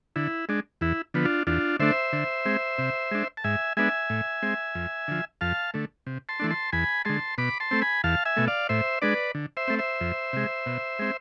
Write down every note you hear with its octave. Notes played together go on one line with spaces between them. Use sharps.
D3 E4
G#3 D4
E2 E4
D3 F3 B3
D4 F4
E2 D4 F4
D3 A3 D4 C5 E5
D3
G#3 C4
C3
G#3 D4
A5
G#2 E5 G#5
G#3 B3 D4 E5 G#5
A2
G#3 C4
F2
D3 F3
F2 F5 A5
D3 A3
C3
A5 C6
E3 A3 D4
A5 C6
E2 G#5 B5
D3 G#3 A5 C6
B2 B5 D6
A5 C6
A3 C4
G#5 B5
E2 F5 A5
E5 G#5
B2 A3
D5 F5
A2 C5 E5
G#3 D4 B4 D5
D3
C5 E5
A3 C4
C5 E5
F2
C3 G#3
B2
G#3 C4